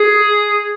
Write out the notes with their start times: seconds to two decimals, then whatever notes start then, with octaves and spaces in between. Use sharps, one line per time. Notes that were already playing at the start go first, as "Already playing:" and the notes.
Already playing: G#4